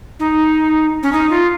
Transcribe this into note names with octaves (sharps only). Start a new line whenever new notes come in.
D#4
C#4
D#4
F4